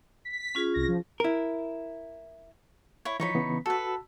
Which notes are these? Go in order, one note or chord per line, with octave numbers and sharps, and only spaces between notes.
B6
C#4 F4 G#4
C2 A#6
F3
E4 A#4
E4 C#5
E3 F3 D#4 C#5 B5
C#3 E3 B3
F#4 A4 B4 A5 E6